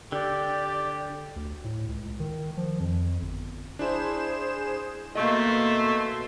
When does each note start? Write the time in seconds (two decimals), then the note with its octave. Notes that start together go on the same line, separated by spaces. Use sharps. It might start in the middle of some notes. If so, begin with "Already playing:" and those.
0.12 D3 G4 D5
1.36 D2
1.64 A2
1.88 C#2
2.05 C#2
2.20 D#3
2.57 F3
2.80 F2
3.22 G1
3.79 D4 E4 G#4 C5 E7
5.15 B2 A3 A#3 D#5 C6 C#6 G6